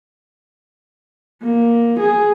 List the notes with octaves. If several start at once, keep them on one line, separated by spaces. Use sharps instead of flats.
A#3
G#4